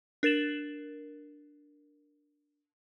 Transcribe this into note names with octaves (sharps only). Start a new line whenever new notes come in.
D4 A#4 A6 E7 F#7